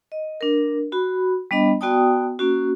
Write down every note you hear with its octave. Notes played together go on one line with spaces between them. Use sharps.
D#5
D4 A#4
F#4 B5
G3 B3 D4 D#5 B5
B3 F#4 D5 G5 A5 D#6
A#3 C#4 F#4